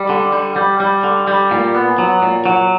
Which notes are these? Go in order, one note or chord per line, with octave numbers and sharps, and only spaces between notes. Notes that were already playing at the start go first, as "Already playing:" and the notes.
Already playing: G3
D3
G3
G3
G3
D3
G3
A#2
B3
F#3
A#2
F#3